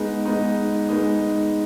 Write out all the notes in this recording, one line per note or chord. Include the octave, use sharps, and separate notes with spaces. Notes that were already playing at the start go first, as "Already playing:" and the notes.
Already playing: G#3 B3 D#4
G#3 B3 D#4
G#3 B3 D#4